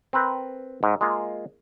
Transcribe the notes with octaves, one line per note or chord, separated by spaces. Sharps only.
C4 A#4 B4
G#2
G#3 A#3 F4